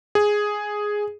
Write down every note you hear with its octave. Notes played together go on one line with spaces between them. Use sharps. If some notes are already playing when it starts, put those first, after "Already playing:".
G#4